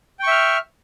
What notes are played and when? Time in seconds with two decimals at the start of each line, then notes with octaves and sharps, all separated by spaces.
0.19 G5
0.23 C#6
0.27 E5
0.31 F6